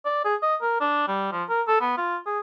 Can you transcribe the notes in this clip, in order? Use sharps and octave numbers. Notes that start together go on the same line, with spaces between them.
D5
G#4
D#5
A#4
D4
G3
F3
A#4
A4
B3
F4
G#4